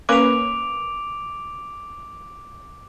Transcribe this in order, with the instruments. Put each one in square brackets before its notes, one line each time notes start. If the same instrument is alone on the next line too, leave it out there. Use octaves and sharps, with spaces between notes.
[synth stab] A#3 C#4 B4 [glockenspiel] D6 D7 F7